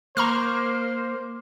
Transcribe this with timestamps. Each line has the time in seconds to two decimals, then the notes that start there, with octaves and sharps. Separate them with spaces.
0.17 A#3 C5 A#5 C#6 F6